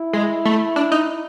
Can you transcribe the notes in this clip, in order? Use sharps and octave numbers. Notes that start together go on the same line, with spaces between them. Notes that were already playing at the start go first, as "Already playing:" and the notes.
Already playing: E4
G#3
A3
D4
D#4